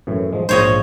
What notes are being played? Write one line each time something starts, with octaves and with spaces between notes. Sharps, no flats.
F#2 A2 E3
F3 G#3
A#1 G#2 F4 C5 C#5 D#5